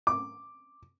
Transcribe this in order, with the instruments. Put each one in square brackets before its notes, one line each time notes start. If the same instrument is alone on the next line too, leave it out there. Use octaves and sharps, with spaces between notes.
[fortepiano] D6